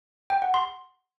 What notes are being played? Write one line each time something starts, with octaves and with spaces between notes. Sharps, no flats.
G5
F#5
C6